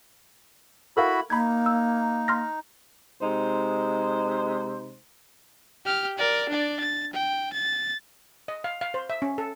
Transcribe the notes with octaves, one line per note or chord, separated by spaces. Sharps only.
E4 F#4 A4 A#4 F5 B5
A#3 D#4 B5 G#6
E6
C6 F6 A#6
C3 G#3 D#4 C5
G4 F6
A#4 D5
D4 D5
A6
G5
A6
D#5
F5
F5
C5
E5
C#4
A4